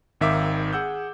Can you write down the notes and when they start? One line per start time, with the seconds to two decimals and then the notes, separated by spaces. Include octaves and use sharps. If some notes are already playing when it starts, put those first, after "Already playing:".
0.21 G#1 D#3 E5 F5 D6
0.73 G#4 F#5 E6 G6